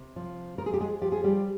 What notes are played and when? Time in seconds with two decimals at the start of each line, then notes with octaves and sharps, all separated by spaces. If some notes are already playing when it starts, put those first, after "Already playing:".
Already playing: C3
0.16 F3
0.58 F3 A#4
0.66 G#4
0.74 G4
0.80 G#3 G#4
1.02 F3 G4
1.12 G#4
1.24 G3 G4